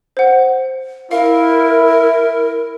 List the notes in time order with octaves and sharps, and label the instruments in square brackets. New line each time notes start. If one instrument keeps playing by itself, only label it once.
[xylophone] C5 F#5
[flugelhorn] E4 [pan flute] A#4 [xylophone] F5